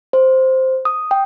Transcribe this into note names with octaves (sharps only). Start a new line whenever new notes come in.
C5
D#6
G5